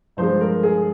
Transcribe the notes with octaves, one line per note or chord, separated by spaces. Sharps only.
G2 F3 G#3 C5
A#4
G#4